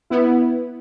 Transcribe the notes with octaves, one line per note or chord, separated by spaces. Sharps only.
B3 E4